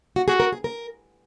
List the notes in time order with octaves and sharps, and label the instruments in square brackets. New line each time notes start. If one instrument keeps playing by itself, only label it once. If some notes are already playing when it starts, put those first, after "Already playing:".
[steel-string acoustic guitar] F#4
[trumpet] F#4 [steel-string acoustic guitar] G#4
[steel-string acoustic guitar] A#4
G#4
A#4